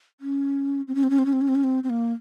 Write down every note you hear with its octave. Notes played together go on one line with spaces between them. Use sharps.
C#4
C4
C#4
C4
C#4
C4
C#4
C4
C#4
C4
C#4
C4
C4
A#3